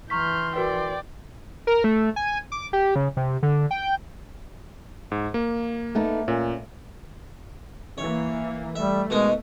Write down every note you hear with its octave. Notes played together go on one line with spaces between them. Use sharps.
E3 A#5 C6 C#6 F6 G6 B6
F#4 A#4 B4 D5 G5
A#4
A3
G#5
D6
G4
C#3
C3
D3
G5
G#2
A#3
A3 B3 D#4
A#2 C#4
E3 A#3 C#5
G3 A3 E5
B2 G#3 D#4 A#4